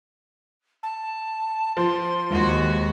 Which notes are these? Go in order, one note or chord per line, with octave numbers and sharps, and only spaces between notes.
A5
F3 C6
D#2 G#3 F#4